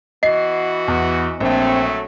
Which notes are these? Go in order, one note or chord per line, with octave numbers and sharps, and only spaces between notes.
E3 B3 F#4 D#5 C7
E2
A#1 F#3 A3 C4